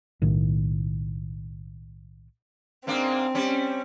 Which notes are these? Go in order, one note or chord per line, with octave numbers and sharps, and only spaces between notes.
B1 A2 D#3
G#2 A#3 C4 D4
G3 C#4